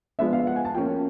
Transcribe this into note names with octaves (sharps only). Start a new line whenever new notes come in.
F3 G#3 B3 D4 E5
F5
F#5
G#5
A5
F3 A#3 C#4 G5